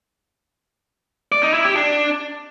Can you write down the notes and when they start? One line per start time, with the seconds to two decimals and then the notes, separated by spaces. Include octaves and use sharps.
1.32 D5
1.43 D#4
1.54 E4
1.65 G4
1.75 D4